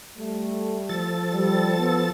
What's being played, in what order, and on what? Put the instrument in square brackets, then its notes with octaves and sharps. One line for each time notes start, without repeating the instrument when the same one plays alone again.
[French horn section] G3 A3
[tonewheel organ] F3 A4 A6
[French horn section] G3
B3